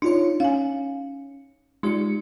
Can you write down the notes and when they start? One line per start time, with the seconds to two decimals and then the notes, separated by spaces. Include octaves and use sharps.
0.02 D4 D#4 F4 C#5
0.40 C#4 F5 G#5
1.83 G#3 D#4 F4 G4 D5 C#7